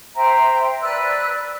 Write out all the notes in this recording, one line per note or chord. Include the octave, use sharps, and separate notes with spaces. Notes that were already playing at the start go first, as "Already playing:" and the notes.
C5 E5 G5 A#5
B4 D5 E6 F#6